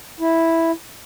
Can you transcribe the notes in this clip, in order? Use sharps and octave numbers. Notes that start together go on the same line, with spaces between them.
E4